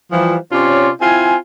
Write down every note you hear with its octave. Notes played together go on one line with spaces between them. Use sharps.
E3 F3 G3
C3 C#4 F4 C#5 D5 C6
C4 E4 F4 G#5